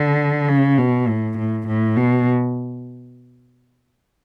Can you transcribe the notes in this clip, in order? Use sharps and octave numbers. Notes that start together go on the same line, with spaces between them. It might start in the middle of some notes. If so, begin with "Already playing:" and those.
Already playing: D3
C#3
B2
A2
A2
A2
B2